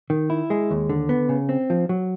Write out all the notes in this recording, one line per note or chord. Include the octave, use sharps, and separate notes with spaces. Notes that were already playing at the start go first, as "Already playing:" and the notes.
D#3
E4
G#3
D#2
D3
B3
C#3
C4
F3
F#3